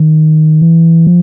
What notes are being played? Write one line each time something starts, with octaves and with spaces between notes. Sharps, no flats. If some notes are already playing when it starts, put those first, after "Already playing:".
Already playing: D#3
E3
F3